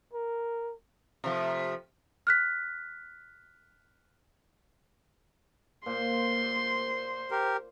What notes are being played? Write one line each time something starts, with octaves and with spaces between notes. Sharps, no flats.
A#4
C3 F3 A3
F6 F#6 B6
A#2 C5 C6
G4 A#4